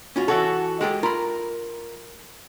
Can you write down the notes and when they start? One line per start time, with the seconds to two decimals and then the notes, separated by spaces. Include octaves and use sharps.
0.16 C#4 F4 F#4
0.28 E3 F#4 A4 C#5
0.81 G#3 F#4 G4 A4
1.03 F4 A#4 B5